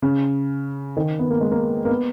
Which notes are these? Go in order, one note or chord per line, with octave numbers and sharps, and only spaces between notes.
C#3
D#3
B3
A#3
G#3
A#3
A#3
B3